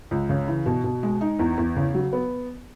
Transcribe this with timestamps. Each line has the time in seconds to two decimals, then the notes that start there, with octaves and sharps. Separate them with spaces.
0.11 C#2
0.29 C#3
0.48 E3
0.66 B2
0.84 B2
1.03 G#3
1.21 D#4
1.39 E2
1.58 E2
1.76 C#3
1.94 F#3
2.13 B3